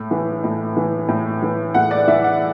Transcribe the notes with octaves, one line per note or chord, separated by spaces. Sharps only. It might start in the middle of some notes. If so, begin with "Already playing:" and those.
Already playing: A2
E3
A2
E3
A2
E3
A2 F#5
D5
E3 E5
F#5